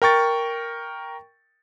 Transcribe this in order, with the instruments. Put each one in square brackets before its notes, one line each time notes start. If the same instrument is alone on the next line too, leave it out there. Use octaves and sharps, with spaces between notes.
[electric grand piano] A#4 G5 C#6 A6